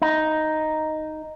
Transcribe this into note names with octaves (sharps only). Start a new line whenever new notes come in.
D#4